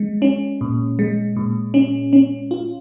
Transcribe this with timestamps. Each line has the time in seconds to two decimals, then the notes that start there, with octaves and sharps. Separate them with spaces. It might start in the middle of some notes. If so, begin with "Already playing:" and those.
Already playing: G#3
0.22 C#4
0.61 A#2
0.99 G#3
1.36 A#2
1.74 C#4
2.13 C#4
2.51 F4